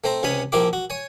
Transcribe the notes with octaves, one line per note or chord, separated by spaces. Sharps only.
A3 C4 C5 A#5
C#2 C3 C#4 G#5 B5
A#1 F3 A#3 E4 G4 D6
F#4
C#5 G#5